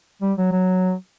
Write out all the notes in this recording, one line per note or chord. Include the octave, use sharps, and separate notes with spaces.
G3
F#3
F#3